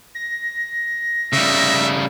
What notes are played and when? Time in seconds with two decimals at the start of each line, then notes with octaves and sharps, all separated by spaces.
0.15 A#6
1.33 C#3 G3 E5